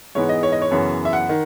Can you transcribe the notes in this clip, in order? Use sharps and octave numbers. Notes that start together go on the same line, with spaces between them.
G#2 E3 G#3 B3 C#5
D#5
C#5
D#5
C#5
F#2 C#3 E3 B3
E5
F#5
D#3